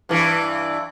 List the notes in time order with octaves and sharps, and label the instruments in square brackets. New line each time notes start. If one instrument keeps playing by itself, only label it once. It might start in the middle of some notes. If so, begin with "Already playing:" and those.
[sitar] G2 E3